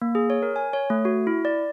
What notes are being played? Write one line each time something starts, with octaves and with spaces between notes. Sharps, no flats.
A#3
G#4
C#5
A#4
G#5
C#5
A3
F#4
E4
D5